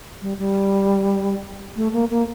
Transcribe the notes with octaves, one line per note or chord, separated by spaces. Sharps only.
G3
G3
A3
A#3
A#3